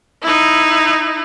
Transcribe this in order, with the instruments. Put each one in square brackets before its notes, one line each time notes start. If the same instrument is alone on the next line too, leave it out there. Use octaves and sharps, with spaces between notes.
[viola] D#4 E4